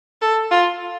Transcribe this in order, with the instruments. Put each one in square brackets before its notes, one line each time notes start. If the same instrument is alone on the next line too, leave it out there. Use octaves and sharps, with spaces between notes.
[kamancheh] A4
F4